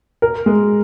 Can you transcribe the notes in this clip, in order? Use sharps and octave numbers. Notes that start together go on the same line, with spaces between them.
A#4
G#3